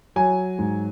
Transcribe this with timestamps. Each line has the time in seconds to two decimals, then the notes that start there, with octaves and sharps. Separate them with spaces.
0.16 F#3 G#5
0.59 G#2